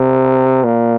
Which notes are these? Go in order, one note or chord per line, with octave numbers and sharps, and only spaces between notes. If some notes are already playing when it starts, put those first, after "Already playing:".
Already playing: C3
A#2